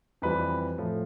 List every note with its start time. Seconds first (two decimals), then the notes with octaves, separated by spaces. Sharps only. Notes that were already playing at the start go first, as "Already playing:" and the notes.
0.22 F2 E3 G3 B4
0.78 A2 F3 A3